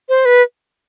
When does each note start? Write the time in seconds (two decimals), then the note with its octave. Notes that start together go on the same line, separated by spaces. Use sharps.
0.09 C5
0.25 B4